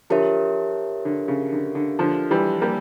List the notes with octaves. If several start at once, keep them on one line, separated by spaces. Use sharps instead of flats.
D3 F3 G4 A#4 C#5 E5
D3
C#3
D3
D3
D3 F3
E3 G3
G3 A#3